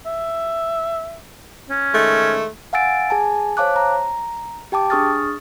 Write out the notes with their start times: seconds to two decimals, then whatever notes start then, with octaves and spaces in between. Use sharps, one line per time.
0.06 E5
1.69 C#4
1.94 D#3 G#3 A3
2.73 F5 F#5 G#5 E6 A6 D7
3.10 G#4 G#5 A5
3.57 C5 C#5 F5 A5 D6 F#6
3.76 A#5
4.72 G4 G5 A5 D6
4.90 D4 G#4 C#6 D#6 F6 A6